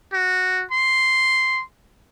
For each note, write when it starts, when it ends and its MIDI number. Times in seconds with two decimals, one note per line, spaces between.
0.13 0.64 66
0.71 1.62 84